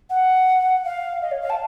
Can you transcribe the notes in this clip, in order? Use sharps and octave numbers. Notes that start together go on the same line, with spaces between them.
F#5
F5
D#5
C#5
F5
A5